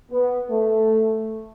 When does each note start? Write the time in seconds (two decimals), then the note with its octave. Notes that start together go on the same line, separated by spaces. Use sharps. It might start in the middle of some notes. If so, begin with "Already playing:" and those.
0.10 B3
0.50 A3